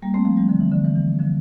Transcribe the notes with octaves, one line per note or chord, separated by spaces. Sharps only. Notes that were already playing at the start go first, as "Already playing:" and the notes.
G3 A#3
A3 C4
F3 A3
E3 G3
D3 F3
E3
D3
E3
E3
D3 F3